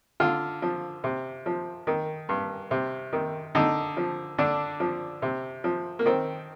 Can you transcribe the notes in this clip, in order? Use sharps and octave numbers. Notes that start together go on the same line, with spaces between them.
D3 F4
F3
C3
F3
D#3
G2
C3
D#3
D3 D#4
F3
D3 D4
F3
C3
F3
A#3
D#3 C4